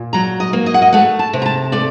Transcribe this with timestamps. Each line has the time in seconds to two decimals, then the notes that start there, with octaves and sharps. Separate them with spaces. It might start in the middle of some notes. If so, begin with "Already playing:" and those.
Already playing: A#2
0.13 F#3 A#5
0.40 D#5
0.53 A#3
0.66 D#5
0.74 F#5
0.82 D#5
0.93 A3 F#5
1.19 A5
1.33 C3
1.42 A#5
1.46 A5
1.72 A3 D5